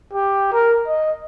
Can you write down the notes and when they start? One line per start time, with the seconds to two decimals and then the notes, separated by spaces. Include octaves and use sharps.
0.13 G4
0.53 A#4
0.87 D#5